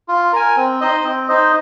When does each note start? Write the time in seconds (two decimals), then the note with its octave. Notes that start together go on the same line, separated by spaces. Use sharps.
0.08 F4
0.32 A#4 G#5
0.56 C4
0.81 D#4 C5 D#5
1.04 C4
1.28 D#4 C5 D#5